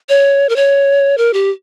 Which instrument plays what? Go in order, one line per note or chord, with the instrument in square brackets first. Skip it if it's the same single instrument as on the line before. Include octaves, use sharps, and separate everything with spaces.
[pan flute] C#5
A#4
C#5
A#4
G4